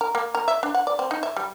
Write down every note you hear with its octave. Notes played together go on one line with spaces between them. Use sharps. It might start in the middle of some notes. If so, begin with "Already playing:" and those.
A#4
A#3
A#4
E5
D4
F#5
D5
C4
D#4
E5
G3